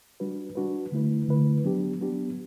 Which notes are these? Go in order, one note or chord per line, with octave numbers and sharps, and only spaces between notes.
G3 D4 F#4 B4
G3 D4 F#4 B4
D3 A3 E4 B4
D3 A3 E4 B4
F#3 B3 D4 G4
F#3 B3 D4 G4